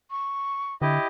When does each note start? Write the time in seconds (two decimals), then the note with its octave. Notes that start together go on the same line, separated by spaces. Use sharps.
0.11 C#6
0.82 D3 E4 G4 D#5